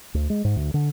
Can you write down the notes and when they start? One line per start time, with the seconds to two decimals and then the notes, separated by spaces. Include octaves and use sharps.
0.14 D2
0.30 G#3
0.45 G#2
0.56 D2
0.74 D3